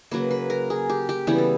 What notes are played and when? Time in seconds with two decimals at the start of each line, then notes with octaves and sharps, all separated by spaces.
0.11 C#3 F#3 A#3 B4
0.31 B4
0.50 A#4
0.70 G#4
0.90 G4
1.09 G4
1.27 C#3 E3 G3 B3 G4
1.38 A4